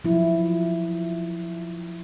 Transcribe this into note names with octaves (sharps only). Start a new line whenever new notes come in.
F3 F#3 E4